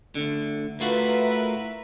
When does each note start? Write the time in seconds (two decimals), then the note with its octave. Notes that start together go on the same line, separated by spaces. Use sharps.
0.15 D2 D3
0.80 A2 F4 F#4 A#4 B4 E5